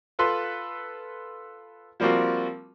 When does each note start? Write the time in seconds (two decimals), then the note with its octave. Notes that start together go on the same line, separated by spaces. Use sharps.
0.19 F4 A4 B4 C6
2.00 F3 G3 A#3 C4 F4 F#4